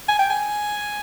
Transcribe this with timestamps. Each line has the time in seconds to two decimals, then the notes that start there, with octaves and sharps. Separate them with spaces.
0.08 G#5
0.19 G5
0.30 G#5